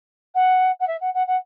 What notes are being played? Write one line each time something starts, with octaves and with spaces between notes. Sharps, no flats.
F#5
F#5
E5
F#5
F#5
F#5